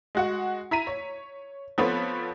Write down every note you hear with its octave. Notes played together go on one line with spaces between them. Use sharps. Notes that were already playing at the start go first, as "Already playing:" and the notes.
G#3 F#4 F#5
E4 A#5 B6 D#7
C#5
F3 B3 C4 A4 B4 C#5